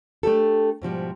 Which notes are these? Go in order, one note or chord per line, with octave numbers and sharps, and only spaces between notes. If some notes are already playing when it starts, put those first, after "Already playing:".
A3 D4 G4 A4
G#2 B2 F3 G3